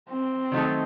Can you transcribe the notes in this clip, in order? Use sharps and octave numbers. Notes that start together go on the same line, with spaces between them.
C4
D#3 F#3 A3 D#4 A4